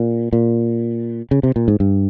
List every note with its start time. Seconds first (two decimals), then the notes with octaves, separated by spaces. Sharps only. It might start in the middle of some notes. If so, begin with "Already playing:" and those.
Already playing: A#2
0.33 A#2
1.31 C#3
1.43 C3
1.56 A#2
1.68 G#2
1.80 G2